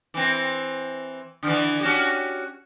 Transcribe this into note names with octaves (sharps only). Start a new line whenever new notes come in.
E3 C4
D3 E3
C#4 F#4 G4